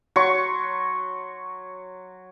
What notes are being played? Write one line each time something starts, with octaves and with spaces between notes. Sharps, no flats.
F#3 C6 C#6